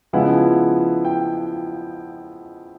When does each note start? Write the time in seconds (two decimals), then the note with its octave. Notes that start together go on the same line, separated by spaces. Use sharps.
0.13 C#3 F3 G#3 B3 E4 F#5
1.05 G5